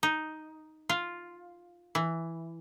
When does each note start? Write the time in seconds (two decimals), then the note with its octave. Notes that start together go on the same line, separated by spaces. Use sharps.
0.03 D#4
0.89 F4
1.95 E3